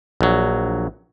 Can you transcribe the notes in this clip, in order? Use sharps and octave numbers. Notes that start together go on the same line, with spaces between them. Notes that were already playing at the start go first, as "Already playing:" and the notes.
A#1 F#3